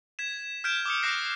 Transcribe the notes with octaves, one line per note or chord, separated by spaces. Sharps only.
G#6 B6 E7
F6 G6 G#6 B6 D7 E7
D6 D#6 C#7
D6 F6 F#6 A#6 C7